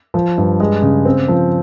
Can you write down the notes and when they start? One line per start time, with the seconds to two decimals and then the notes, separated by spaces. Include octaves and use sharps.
0.14 F3
0.38 G2
0.60 G#3
0.82 C#3
1.05 C4
1.28 F3